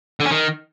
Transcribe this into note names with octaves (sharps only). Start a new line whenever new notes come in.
D3
C#4
D#3